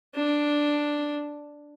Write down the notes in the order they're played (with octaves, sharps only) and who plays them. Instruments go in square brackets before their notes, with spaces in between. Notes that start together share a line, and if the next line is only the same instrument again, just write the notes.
[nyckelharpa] D4